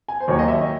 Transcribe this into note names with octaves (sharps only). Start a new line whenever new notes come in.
G#5
C5
D#2 D#3 F#3 C#5
D#5
E5